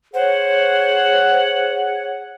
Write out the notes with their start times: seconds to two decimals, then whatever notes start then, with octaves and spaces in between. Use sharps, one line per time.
0.14 G#4 C5 C#5 F#5